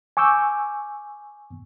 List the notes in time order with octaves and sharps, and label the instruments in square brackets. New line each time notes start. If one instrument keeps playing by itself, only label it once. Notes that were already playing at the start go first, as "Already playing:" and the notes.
[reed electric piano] G#5 C#6 D6 E6 G6